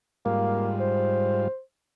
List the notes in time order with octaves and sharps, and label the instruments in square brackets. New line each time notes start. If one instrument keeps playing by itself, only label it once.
[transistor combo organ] G#2 G3 F4 [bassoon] A#3
[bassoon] C5